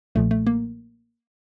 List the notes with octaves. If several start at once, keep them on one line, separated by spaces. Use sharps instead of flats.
B1 A#2 F3 A3
A3
A#3